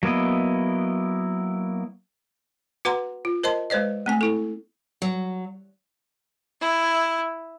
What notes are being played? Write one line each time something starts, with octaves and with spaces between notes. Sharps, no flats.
F#3 A#3 B3 E4 D#5
F#4 B4 F#5 A#5 C6
F4
A#4 C5 D#5 A5 C6
G#3 B4 C5 D5 D#5
A3 C4 G#5
E4 A4
F#3
E4